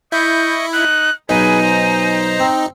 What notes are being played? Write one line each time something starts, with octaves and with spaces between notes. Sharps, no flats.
E4 D#5 C#6 G6
D#4 F#6
B1 D#4 G#4 B4 G#5
C5 A#5
C4